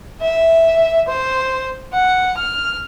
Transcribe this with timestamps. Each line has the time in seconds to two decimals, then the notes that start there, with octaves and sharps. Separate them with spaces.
0.21 E5
1.08 C5
1.94 F#5
2.37 F6